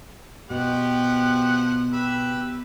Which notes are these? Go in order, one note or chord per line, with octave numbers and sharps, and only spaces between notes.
B2 F3 G4 F#5
G4 B4 E5